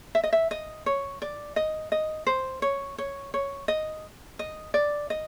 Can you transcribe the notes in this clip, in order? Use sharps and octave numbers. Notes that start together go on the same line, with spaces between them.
E5
D#5
E5
D#5
C#5
D5
D#5
D#5
C5
C#5
C#5
C#5
D#5
D#5
D5
D#5